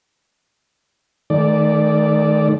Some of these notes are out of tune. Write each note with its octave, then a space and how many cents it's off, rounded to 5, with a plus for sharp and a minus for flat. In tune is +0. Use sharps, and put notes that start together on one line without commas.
D#3 +0 A3 -40 D5 +0